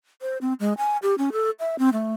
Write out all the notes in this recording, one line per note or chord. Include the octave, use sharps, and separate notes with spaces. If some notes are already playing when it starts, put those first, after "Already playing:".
C5
C4
G#3
G#5
G4
C#4
A4
E5
C4
A3